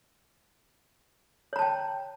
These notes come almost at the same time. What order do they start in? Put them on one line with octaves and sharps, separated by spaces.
C#5 A#5 A5 G5